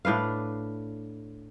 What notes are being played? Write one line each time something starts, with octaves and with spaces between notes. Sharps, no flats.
A2 D4 B4 F5